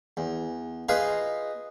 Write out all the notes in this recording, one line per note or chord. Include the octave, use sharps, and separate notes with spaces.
E2
D#4 F4 G#4 B4 D#5 F5